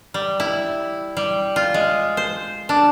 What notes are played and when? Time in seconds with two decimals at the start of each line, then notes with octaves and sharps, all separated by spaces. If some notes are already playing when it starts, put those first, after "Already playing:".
0.14 G3
0.40 E4
1.17 G3
1.56 F4
1.74 G#3
2.17 C5
2.69 D4